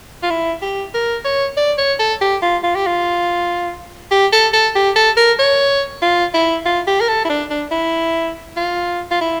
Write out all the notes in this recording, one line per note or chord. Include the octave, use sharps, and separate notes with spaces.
F4
E4
G4
A#4
C#5
D5
C#5
A4
G4
F4
F4
G4
F4
G4
A4
A4
G4
A4
A#4
C#5
F4
E4
F4
G4
A#4
A4
E4
D4
D4
E4
F4
F4
E4